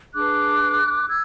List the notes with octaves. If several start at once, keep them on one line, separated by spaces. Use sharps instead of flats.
D4 G#4 B4 D6 F#6
E6 G#6